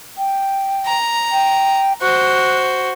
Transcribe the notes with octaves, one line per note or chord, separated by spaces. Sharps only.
G5
A#5
G5
F#4 C5 F#6